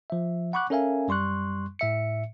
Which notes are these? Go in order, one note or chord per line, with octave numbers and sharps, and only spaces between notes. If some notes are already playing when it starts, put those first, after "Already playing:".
F3 E5
F#5 B5 C#6 D6 F#6
C#4 A4 A#4 E5 F5 G#5
F#2 G3 C6 C#6 F#6
A2 E5 C#7